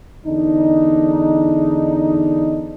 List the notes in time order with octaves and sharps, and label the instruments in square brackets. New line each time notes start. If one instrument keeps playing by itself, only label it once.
[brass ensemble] E2 D3 D4 D#4